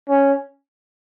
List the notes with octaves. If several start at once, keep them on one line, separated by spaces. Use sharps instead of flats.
C#4